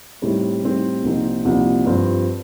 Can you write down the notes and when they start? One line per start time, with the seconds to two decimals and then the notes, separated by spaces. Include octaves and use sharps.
0.22 A2 G3 C4 D#4
0.63 A2 G3 C4 D#4
1.03 C2 A#2 F3 C4 D#4
1.45 C2 A#2 F3 C4 D#4
1.86 G2 F3 C4 F4